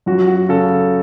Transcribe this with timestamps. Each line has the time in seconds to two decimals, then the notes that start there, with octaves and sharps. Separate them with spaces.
0.06 F#2 F#4
0.28 F#4
0.49 C#3 A4